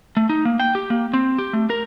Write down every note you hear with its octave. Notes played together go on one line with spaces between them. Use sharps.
A3
D#4
A#3
G5
G4
A#3
C4
G4
A3
A#4